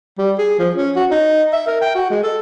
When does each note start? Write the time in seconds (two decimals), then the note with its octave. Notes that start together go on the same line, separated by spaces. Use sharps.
0.18 G3
0.38 G#4
0.59 F3
0.76 C#4
0.96 F#4
1.11 D#4
1.53 E5
1.67 A#4
1.81 G5
1.95 F#4
2.10 G#3
2.23 A4